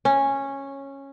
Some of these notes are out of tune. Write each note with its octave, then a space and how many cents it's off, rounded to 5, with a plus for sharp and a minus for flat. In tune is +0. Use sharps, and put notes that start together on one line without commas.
C#4 -10